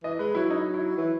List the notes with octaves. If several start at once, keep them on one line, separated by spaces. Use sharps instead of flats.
E3 D#5
G#3 B4
F#3 E4
D#4
E4
E3